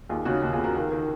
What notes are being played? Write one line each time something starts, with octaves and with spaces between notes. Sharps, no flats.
D#2 F4 G#4
C#3 D#4 F#4
D#2
F4 G#4
C#3
F#4 A#4
D#3
D#3